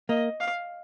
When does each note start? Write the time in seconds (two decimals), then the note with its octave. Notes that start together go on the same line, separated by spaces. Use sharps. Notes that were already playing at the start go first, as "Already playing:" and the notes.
0.09 A#3 D#5
0.40 F5